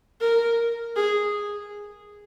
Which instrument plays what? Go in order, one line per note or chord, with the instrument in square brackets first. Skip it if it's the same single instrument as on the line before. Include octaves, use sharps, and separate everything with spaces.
[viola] A#4
G#4